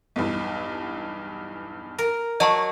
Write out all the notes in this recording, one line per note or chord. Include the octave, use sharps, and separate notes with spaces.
B1 E2 G2
A#4
F#3 D#5 A5 C#6